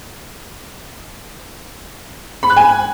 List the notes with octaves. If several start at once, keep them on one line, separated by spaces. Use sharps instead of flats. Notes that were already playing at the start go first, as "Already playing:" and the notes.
B5
F#6
G#5